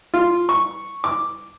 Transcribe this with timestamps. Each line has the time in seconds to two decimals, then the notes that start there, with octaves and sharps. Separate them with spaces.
0.14 F4
0.49 C#6
1.04 D6